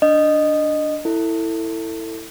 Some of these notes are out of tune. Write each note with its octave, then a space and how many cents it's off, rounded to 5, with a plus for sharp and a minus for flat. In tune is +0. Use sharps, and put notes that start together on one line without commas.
D4 +0 D#5 -15
E4 +0 A4 +25